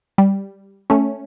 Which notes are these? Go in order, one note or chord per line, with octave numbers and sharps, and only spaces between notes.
G3
A3 C#4